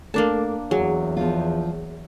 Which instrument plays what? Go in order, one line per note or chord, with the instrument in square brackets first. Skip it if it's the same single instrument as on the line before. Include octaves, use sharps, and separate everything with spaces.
[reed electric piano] A3 A4 A#4 [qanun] A#3 D4 A5
[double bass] E2 [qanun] F#3 [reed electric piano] G#4
[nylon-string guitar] F3 B3 F4